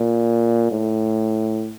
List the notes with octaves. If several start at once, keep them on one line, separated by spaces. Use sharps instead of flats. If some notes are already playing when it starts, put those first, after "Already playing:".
Already playing: A#2
A2